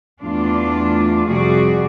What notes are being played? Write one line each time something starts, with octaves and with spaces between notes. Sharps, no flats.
E2 A3 D4 F4
F2 C3 G3 F#4 G#4 D5